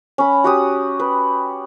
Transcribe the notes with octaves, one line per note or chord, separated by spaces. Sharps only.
C#4 B5
F#4 G4 D#6
B4